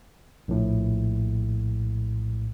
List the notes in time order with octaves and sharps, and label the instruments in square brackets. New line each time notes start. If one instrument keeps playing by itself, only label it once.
[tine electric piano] A#1 A2